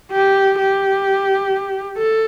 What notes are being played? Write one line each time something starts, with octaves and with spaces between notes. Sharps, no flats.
G4
G4
A4